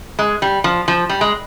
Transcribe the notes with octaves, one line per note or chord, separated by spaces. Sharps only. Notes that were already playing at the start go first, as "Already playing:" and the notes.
G#3
G3
F3
F3
G3
G#3